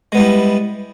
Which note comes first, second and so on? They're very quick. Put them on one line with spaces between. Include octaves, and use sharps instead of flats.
G#3 B3 G3 E4